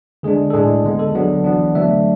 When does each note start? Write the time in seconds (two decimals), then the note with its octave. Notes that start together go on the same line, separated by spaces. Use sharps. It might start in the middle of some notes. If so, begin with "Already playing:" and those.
0.23 D3 G#3 D4 G#4
0.50 A4
0.53 A2 G#3 D4 G#4
0.85 D3 G#3 B3
0.99 A4
1.14 D3 F#3 B3 D4
1.44 E3 B3 D4
1.75 D3 F#3 A3 D4 E5